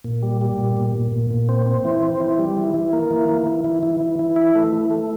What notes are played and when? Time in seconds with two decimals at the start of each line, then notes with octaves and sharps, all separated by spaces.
0.05 A#2
0.23 G3
0.41 G3
0.58 A#2
0.77 A#2
0.95 A#2
1.12 A#2
1.31 A#2
1.49 C4
1.66 C4
1.85 E3
2.03 C4
2.20 E3
2.39 G3
2.57 E3
2.74 E3
2.93 A#3
3.11 E3
3.29 E3
3.47 E3
3.64 E3
3.83 E3
4.01 E3
4.19 E3
4.36 E4
4.55 A3
4.73 E3
4.91 A3